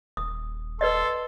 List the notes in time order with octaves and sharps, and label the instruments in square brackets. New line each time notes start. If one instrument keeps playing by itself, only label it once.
[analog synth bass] D#1 [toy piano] D#6
[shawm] A4 [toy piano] B4 D5 D#5 [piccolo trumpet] C6